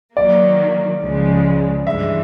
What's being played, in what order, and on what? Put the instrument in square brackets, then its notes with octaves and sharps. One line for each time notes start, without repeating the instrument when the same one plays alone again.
[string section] D#3 F#3 A#3 [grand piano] D5
[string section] C#2 C#3 F3 G#3
[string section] G2 E3 G#3 [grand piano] E5